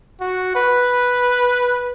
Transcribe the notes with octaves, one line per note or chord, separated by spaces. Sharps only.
F#4
B4